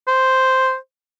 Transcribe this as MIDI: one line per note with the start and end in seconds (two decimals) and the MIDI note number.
0.08 0.76 72